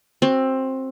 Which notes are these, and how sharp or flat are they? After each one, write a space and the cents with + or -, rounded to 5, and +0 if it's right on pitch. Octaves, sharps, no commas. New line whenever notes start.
C4 +15 F#4 +0